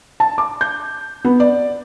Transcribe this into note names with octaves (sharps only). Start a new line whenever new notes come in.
A5
D6
G6
B3
D5